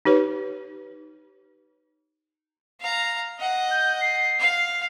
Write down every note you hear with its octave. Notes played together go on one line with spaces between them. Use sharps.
D#4 G4 B4 C#5
F5 A#5
D#5 F#5
G6
C7
F5